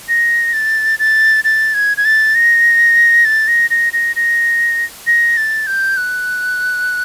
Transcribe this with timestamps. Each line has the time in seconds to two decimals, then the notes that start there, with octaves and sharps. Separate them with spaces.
0.09 A#6
0.53 A6
0.99 A6
1.44 A6
1.74 G#6
1.97 G#6
2.05 A6
2.35 A#6
3.25 A6
3.48 A#6
3.70 A#6
3.93 A#6
4.16 A#6
5.07 A#6
5.37 A6
5.67 G6
5.97 F#6